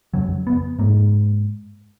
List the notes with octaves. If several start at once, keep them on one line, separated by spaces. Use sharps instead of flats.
F2 C#3 F#3
B3
G#2 A#3